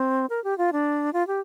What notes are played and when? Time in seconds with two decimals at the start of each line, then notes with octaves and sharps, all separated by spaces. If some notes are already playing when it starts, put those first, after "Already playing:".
Already playing: C4
0.30 A#4
0.44 G4
0.58 F4
0.72 D4
1.13 F4
1.27 G4